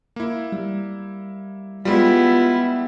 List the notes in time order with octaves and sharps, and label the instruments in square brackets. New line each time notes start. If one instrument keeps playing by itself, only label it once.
[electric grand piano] A#3 E4
[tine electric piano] G3
[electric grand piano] G3 G#3 [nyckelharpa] B3 E4 [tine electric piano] F4